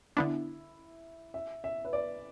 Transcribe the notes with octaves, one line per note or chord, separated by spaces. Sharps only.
D3 B3 D4 E4
E5
E5
B4
D5